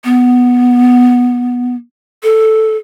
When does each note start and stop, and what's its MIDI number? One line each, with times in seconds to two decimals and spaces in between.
0.04 1.75 59
2.23 2.77 69